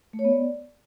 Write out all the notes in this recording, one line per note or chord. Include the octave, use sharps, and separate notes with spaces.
A3
C#5
B3
D5